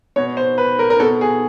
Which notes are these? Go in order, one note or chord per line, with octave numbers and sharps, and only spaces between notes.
B2 C#5
C5
B4
A#4
A#4
B2 A4
G#4